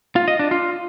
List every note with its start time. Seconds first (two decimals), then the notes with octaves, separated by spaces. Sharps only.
0.16 F4
0.28 D#5
0.39 D4
0.51 F4